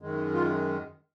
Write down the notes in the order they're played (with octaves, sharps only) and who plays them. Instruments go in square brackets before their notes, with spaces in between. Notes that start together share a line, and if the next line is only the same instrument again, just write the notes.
[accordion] F#2 D#3 G#3
F4